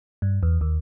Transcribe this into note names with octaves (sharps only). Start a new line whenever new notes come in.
G2
E2
D#2